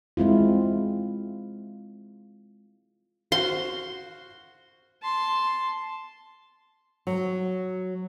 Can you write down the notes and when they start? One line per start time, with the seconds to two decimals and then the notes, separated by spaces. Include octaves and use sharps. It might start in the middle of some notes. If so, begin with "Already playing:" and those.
0.17 G#3 C4 E4 F4
3.32 F#4 C5 F5 C6
5.02 A5 C6
7.07 F#3